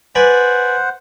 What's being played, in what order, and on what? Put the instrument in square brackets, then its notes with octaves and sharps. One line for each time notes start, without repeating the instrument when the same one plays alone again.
[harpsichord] B4 D5 G#5 [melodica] C5 F#5